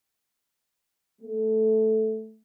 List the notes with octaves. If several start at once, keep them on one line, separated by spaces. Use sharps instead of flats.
A3